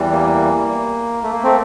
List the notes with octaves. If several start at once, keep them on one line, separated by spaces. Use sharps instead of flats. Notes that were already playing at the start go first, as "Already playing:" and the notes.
Already playing: E2 E3 G3
A#3
A3
A#3
A3 C4